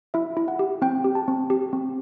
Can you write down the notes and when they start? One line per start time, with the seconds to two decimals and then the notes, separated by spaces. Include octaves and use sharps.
0.14 E4 E5
0.37 E4
0.48 F#5
0.59 G4
0.82 C4 G5
1.04 G4
1.15 A5
1.28 C4
1.50 G4
1.73 C4